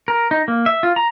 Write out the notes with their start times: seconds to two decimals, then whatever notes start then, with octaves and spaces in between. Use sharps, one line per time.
0.08 A#4
0.31 D#4
0.48 A#3
0.66 E5
0.83 F4
0.96 A#5